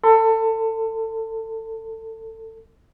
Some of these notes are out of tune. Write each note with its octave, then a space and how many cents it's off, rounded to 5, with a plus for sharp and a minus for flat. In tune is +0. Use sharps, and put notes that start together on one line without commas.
A4 +25 C6 -45